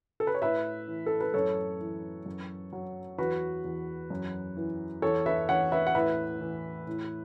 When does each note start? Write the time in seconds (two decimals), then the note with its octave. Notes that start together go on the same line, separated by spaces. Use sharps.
0.20 A4
0.27 B4
0.35 C#5
0.42 A2 B4 E5
0.88 E3
1.06 A4
1.21 B4
1.34 F#2 A4 C#5
1.80 E3
2.26 F#2
2.73 F#3
3.18 E2 F#4 B4
3.64 E2
4.10 F#2
4.57 E3
5.02 E2 A4 C#5
5.26 B4 E5
5.49 E2 C#5 F#5
5.72 B4 E5
5.87 F#5
5.95 A2 B4 E5
6.41 E3
6.87 A2